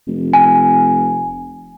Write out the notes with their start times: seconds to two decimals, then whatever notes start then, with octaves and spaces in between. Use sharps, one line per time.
0.07 F1
0.33 G#5